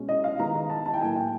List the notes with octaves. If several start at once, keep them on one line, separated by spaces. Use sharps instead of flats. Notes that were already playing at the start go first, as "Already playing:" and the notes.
Already playing: B2 G#3 C#4
D#5
F5
D#3 G#3 B3 D#4 A#5
A#5
A5
A5
G5
A2 F#3 A#3 G#5
G5